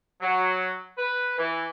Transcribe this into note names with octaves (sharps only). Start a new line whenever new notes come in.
F#3
B4
E3